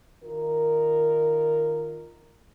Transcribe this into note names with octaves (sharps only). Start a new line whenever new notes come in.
D#3 F4 A#4